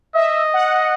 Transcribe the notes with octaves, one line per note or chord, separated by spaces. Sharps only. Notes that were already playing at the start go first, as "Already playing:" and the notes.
D#5 E5
F#5